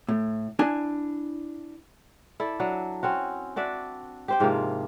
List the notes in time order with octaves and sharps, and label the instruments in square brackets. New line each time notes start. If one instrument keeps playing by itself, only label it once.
[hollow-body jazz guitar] A2
D4 E4 G#5
[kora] E4 A4 D5
F#3 D4
C4 C#4 F#4
D4 F#4 D5 E5
G4 C5 G5
G#2 C3 F3 A#3